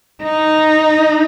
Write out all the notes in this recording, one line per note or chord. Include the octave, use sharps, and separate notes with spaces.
D#4